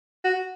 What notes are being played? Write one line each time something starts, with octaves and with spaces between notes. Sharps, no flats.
F#4